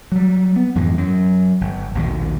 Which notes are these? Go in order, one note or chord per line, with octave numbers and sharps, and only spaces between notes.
F#3 G3
B3
F2 G#2 E3 G#3
F#2 F#3
G1
A#1 D#2 B2 D#3